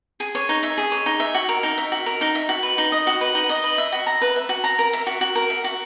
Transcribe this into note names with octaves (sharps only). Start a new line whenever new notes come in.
G#4
C#5
D#4
E5
G#4
C#5
D#4
E5
F#4
A#4
D#4
E5
F#4
A#4
D#4
E5
F#4
B4
D#4
D#5
F#4
B4
D#4
D#5
B4
E5
F#4
A#5
B4
E5
F#4
A#5
A#4
E5
F#4
F#4
A#4
E5
F#4